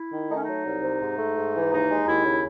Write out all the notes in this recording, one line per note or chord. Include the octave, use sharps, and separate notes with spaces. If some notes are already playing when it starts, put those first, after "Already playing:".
Already playing: E4
D#3
A3 D#4
C#4
F#3 D#4
C2
C3
G#2
A3
G#2
E3
D#2 D#4
G#3
D#2 E4
C#3